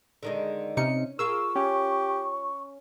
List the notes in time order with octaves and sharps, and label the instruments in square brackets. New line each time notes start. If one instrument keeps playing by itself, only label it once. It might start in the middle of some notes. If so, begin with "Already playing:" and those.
[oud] D3 D#3 G#3
[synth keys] C3 D#4 C#7 [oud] C#4
[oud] F4 G#4 A#4 [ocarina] C#6 [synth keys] E6
[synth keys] C#4 [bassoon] G4